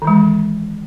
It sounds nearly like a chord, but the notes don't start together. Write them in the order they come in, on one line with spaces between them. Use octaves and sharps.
D#3 E3 G#3